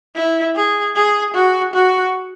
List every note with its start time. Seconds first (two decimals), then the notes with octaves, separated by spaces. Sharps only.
0.15 E4
0.55 G#4
0.95 G#4
1.34 F#4
1.74 F#4